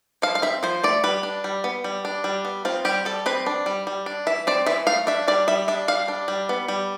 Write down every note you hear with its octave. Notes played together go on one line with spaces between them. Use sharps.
F3 F5
F5
C4 E5
F3 C5
A3 D5
G3 B4
D4
G3
B3
G3
D4
G3
B3
C4 F4
G3 G4
G3 A4
C4 B4
D4
G3
G3
D4
E3 E5
C4 D5
E3 E5
A3 F5
D4 E5
G3 D5
G3 E5
D4 E5
G3 F5
D4
G3
B3
G3